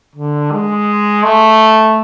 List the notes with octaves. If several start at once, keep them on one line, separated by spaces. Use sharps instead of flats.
D3
G#3
A3